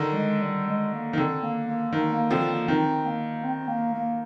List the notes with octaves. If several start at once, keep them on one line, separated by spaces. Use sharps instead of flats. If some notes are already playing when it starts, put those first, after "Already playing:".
Already playing: D3 D#3
G3
G#3
G3
G#3
A#3
D#3
D3 C4
A#3
A#3
D#3 A#3
A#3
D3 F3 C4
A#3
D#3 C4
A#3
C4
A#3
A#3